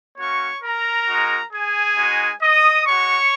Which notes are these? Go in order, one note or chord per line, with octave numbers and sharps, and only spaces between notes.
A#3 C#4 F#4 C#5 C#6
A#4 A#5
G#3 D#4 F#4
G#4 G#5
G#3 D#4 F#4
D#5 D#6
G#3 F#4 C#5 C#6